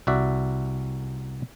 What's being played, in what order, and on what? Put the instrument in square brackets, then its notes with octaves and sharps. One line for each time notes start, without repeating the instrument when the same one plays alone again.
[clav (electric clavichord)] C2 F#4 D5 E5